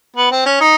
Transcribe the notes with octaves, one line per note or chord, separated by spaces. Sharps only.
B3
C4
C#4
D#4